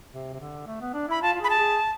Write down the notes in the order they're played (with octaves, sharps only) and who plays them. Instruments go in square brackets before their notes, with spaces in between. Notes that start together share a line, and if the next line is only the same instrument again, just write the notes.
[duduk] C3
C3
D3
A3
B3
D4
[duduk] E4 [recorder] B5
[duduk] F4 [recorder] A5
[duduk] F4
[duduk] G#4 [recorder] B5
[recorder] A5
[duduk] G#4